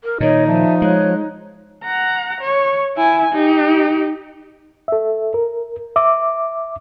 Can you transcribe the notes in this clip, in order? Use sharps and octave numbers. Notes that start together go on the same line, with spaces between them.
A#4
A#2 D#3 D#4 C#5 D#5
F3 D5 E5 A5
G#3 C#5 F#6
F#5 A#5
C#5
E4 G#5
D#4 G4
A4 E5
A#4
E5 D6